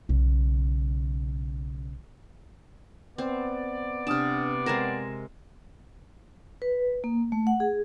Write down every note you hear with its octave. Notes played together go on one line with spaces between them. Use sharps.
B1 C#3
B3 C4 C5 D5
C3 D4 A5 D#6 F6
G#3 C4 A#4 A#6 E7
B4
A#3
A3
F#5
G#4